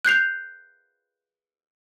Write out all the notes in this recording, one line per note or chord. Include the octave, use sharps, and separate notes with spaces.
F#6 G6 C7 F7